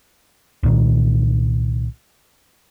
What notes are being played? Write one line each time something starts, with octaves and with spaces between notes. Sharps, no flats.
C2 A#2 D#3